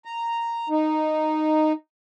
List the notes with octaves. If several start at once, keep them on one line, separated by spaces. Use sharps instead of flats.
A#5
D#4